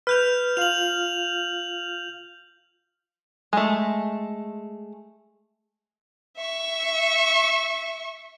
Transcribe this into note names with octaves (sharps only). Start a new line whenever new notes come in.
B4 F6 G6 F7
F4 F5 F7 F#7
G#3 A3
E5 C#6